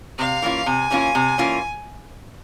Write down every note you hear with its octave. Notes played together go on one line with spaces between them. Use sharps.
C3 F5
E3 A#3 C#4 F4
C3 G#5
E3 A#3 C#4 F4
C3
E3 A#3 C#4 F4